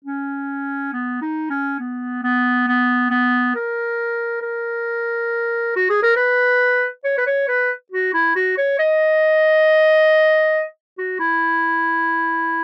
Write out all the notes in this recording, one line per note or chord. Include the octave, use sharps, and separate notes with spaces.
C#4
B3
D#4
C#4
B3
B3
B3
B3
A#4
A#4
F#4
G#4
A#4
B4
C#5
B4
C#5
B4
F#4
E4
F#4
C#5
D#5
F#4
E4